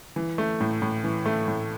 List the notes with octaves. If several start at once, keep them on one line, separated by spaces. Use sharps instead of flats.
E3
A3
A2
A2
E3
A3
A2